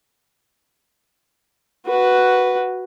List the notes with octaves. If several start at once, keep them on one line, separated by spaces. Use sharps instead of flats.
F#4 B4